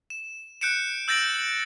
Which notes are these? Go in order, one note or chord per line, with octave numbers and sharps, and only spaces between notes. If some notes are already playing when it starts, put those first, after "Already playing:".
E7
F#6 G6 C#7 D7 E7
E6 G6 A6 A#6 D7 F#7